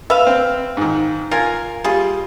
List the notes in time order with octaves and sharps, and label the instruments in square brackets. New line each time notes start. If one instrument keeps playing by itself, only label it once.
[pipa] B4 F5 [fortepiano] E5
[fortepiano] C4
G#2 D#3
[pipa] F4 [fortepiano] A#4 G#5
[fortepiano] G3 [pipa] F4 G#4